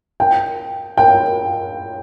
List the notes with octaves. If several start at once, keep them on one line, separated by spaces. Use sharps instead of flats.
G5
G5